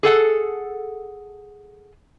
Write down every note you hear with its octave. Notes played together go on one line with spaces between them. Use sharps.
G#4 A4 F#5